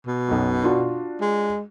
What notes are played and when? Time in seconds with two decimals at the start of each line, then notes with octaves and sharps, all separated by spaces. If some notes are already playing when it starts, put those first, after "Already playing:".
0.07 B2
0.28 B1 F#2
0.64 D4 F4 F#4
1.21 G#3